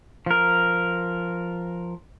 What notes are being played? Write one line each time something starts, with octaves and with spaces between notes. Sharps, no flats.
F3 A#4